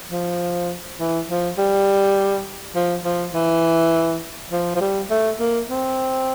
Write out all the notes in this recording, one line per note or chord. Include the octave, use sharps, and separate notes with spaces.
F3
E3
F3
G3
F3
F3
E3
F3
F3
G3
A3
A#3
C4